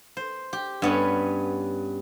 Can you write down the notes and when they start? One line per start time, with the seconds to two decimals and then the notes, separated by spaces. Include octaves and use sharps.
0.17 C5
0.53 G4
0.82 G2 B3 C#4